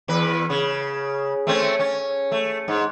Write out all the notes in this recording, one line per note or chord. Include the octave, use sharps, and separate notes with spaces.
E2 B4
C#3
A3 C4 C#4
C#4
A3
G#2